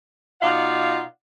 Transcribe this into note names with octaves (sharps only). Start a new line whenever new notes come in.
B2 D#4 F4 D5 F5 F#5